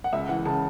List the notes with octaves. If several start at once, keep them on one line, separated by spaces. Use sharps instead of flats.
F#5
C#2 E5
E3 F#5
C#3 A5